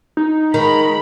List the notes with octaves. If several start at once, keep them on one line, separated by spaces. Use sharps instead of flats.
D#4
D#3 G#3 A#5 B5